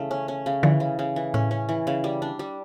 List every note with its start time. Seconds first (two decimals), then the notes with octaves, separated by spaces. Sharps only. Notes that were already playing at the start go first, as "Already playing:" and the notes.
Already playing: C#3 E3 A3
0.11 C#4
0.28 C#4
0.46 C#3
0.63 D3 E3 F3
0.80 C#3
0.99 C#3
1.16 E3
1.34 A2 C#4
1.51 C#4
1.69 E3
1.87 C#3
2.04 G3
2.22 D4
2.39 G3